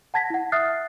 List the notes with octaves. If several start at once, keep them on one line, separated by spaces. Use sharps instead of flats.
F#5 A5 G#6 A#6 B6
E4 F#5
E5 D#6 F6 F#6 A6 C7